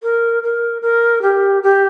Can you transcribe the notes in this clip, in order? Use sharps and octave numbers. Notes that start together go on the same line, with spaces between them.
A#4
A#4
A#4
G4
G4